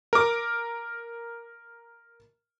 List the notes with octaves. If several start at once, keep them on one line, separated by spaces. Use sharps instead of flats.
A#4 D6